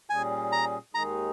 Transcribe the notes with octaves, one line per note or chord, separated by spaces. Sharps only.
A#2 G3 C#4 G#4 G#5
A#5
D#2 D#3 G#3 D#4 G#4 A#5